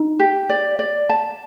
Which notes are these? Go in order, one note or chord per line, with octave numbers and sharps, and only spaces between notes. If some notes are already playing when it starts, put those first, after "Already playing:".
Already playing: D#4
G4
D5
D5
A5